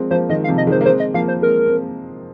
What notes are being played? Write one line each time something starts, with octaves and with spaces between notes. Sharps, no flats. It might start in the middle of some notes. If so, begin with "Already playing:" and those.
Already playing: F3 G#3 A#3 C4
F3 A#3 C5
D#3 G#3 D#5
F5
C3 F3
D#5
D#3 G#3 C5
A#3
G#3 C4 C5
D#5
F3 A#3 F5
C5
G#3 C4 A#4
C4